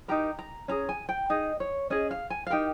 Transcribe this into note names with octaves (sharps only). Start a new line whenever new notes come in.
D#4 G4 A#4 A#5
A#5
C#4 G#4 A#5
G#5
G5
D#4 G#4 D#5
C#5
C#4 G#4 D#5
F5
G#5
F5
D#4 G4 A#4 G5